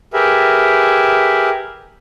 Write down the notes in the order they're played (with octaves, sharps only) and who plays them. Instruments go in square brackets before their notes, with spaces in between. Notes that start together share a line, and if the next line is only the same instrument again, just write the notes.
[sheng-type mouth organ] G4 G#4 A#4 B4 E5